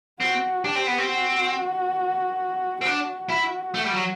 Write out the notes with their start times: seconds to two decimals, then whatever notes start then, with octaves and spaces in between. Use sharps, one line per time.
0.20 C4 F#4
0.64 D4 G4
0.75 C4
0.87 B3
0.98 C4
1.08 F#4
2.82 C4
2.85 D4 F#4
3.29 E4
3.74 A3
3.84 G3
3.94 F#3